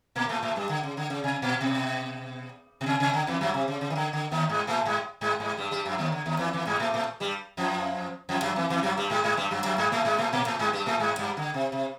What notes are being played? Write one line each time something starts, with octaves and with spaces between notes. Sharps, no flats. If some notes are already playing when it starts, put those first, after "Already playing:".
A#2 A#3
A2 A3
A2 A3
G2 G3
D3
C#3
D3
C#3
C3
A#2
B2
B2
C3
C3
D3
E2 E3
F#2 F#3
C3
C#3
C#3
D#3
D3
D3
D#2 D#3
G#2 G#3
A2 A3
G#2 G#3
G#2 G#3
G#2 G#3
G2 G3
G2 G3
F#2 F#3
D#2 D#3
D3
D#2 D#3
E2 E3
E2 E3
G#2 G#3
A2 A3
A2 A3
G2 G3
F2 F3
F2 F3
F#2 F#3
E2 E3
E2 E3
F#2 F#3
G2 G3
G#2 G#3
G#2 G#3
G2 G3
F#2 F#3
F#2 F#3
G#2 G#3
A2 A3
G#2 G#3
A2 A3
A#2 A#3
A2 A3
G#2 G#3
G2 G3
A2 A3
G#2 G#3
G2 G3
D3
C3
C3